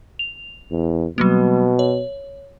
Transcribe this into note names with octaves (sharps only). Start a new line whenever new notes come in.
F7
E2
B2 F#3 G3 A#3
C#5